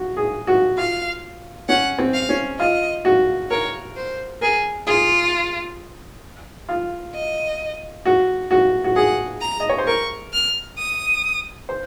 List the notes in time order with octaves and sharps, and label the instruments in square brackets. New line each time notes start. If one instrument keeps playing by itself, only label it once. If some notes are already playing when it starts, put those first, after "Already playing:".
Already playing: [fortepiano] F#4
G#4
F#4
[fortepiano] F4 [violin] F5
[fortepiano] C#4 [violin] F#5
[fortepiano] C4
[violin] F5
[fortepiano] C#4
[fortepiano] F4 [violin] D#5
[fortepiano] F#4
[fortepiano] A#4 [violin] C#5
[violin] C5
[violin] G#4 [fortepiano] A#4
[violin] F4 [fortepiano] G#4
[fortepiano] F4
[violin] D#5
[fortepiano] F#4
F#4
F#4
[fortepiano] G#4 [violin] F#5
[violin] A#5
[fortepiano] D#5
C#5
C5
[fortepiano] A#4 [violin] C#6
[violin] F6
D#6
[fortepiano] C5